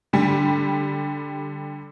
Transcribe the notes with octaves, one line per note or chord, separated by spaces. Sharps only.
D3 G3